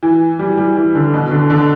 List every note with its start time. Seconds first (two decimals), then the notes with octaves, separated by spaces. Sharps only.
0.03 E3
0.39 G3
0.57 G3
0.76 E3
0.95 D3
1.14 B2
1.31 D3
1.50 D3